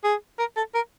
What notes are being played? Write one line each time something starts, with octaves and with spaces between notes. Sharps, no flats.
G#4
A#4
A4
A#4